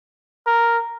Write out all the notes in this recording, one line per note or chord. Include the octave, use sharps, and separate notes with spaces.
A#4